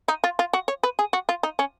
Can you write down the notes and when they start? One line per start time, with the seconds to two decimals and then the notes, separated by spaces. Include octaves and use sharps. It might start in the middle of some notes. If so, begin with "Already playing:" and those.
0.08 D#4
0.24 F4
0.39 F4
0.53 F#4
0.68 C#5
0.83 B4
0.99 G#4
1.13 F#4
1.29 F4
1.43 D#4
1.59 C#4